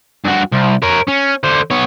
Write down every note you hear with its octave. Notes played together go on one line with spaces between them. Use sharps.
G2 F#4
C2
A#4 C#5
C#4
D3 C5
B3 C#5